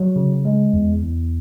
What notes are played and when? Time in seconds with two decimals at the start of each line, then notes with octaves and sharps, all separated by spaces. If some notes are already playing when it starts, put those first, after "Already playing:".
Already playing: F#3
0.16 C#3
0.45 G#3
0.73 E2
1.02 E2